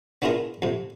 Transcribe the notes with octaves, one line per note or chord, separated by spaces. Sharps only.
B3 D4 E4 F4 G#4 A#4
F2 C3